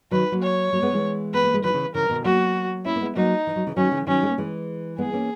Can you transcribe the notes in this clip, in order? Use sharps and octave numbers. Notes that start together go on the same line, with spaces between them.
D#3 F#3 B4
F#3 A#3
C#5
F#3 A#3
G#3 B3
E3 G#3
B3 B4
A#3
G#3
D#3 F#3 B4
C#3 E3
C#3 E3 A#4
B2 D#3
F#3 A#3 F#4
A#3 C#4 E4
A#3
G#3 B3
F#3 A#3 D#4
E3
F#3
C#3 E3
D#3 F#3 C#4
C#3 E3
D#3 F#3 C#4
G#3
A#3
E3 G#3
G#3 B3 G#4
A#3 C#4